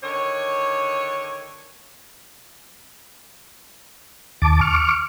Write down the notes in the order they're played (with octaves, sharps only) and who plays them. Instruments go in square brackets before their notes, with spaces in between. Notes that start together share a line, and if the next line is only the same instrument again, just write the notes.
[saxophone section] D3 D#3 C#5
[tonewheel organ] D#2 A5 D6
C#6 D6 F6